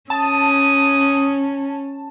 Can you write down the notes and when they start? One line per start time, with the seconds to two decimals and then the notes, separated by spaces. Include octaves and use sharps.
0.10 C#4 A5 D#6